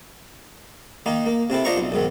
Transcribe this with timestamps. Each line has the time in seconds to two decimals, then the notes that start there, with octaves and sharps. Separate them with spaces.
1.06 D#3 A#3 D#4
1.26 A#3
1.50 C3 C4 E4 A4
1.65 D4 F4 C5 D#5 A#5 C#6
1.77 B1
1.92 B1 G#2 D#3